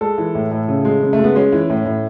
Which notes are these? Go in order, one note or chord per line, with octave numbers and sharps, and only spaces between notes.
G#3 A4
E3
A2
A2
C#3
G#3
C#3
A3
G#3
B3
G#3 C#4
E3
A2
A2